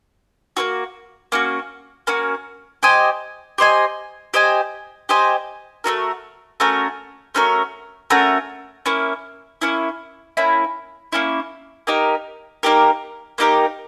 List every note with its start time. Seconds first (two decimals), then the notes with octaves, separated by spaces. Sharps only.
0.57 A#3 C#4 F#4
1.32 A#3 C#4 F#4
2.07 A#3 C#4 F#4
2.83 G4 C5 D#5 G#5
3.58 G4 C5 D#5 G#5
4.34 G4 C5 D#5 G#5
5.09 G4 C5 D#5 G#5
5.84 A3 C#4 F#4 A#4
6.60 A3 C#4 F#4 A#4
7.35 A3 C#4 F#4 A#4
8.10 A3 C#4 F#4 A#4
8.86 A#3 C#4 E4
9.62 A#3 C#4 E4
10.37 A#3 C#4 E4
11.13 A#3 C#4 E4
11.87 A#3 D#4 G4 A#4
12.63 A#3 D#4 G4 A#4
13.38 A#3 D#4 G4 A#4